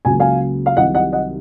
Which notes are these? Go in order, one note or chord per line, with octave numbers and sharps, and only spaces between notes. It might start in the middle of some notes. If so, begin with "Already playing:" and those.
C#2 C#3 F#3 A#3 G#5
F5 G#5
F5
C2 C3 D#3 F#3 D#5 F#5
D#5 F#5
D#5 F#5